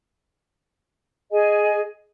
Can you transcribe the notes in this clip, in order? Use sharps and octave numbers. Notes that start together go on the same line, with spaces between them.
G#4 D#5 G#5